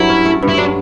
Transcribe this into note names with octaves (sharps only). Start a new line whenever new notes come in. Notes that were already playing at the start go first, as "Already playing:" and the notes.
Already playing: G2 F#3 E4
C#4
A3
G2
E4
F#3 D4